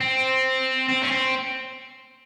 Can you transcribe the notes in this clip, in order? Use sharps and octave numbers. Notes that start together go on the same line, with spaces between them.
C4
C4
C#4
C4